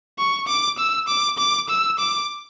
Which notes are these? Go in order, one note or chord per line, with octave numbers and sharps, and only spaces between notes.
C#6
D6
E6
D6
D6
E6
D6